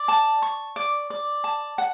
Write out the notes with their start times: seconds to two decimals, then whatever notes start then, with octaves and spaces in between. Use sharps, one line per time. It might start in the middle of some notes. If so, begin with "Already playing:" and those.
Already playing: D5
0.08 A5
0.42 C#6
0.76 D5
1.10 D5
1.44 A5
1.78 F#5